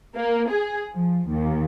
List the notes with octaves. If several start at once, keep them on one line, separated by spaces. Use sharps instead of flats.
A#3
G#4
F3
D#2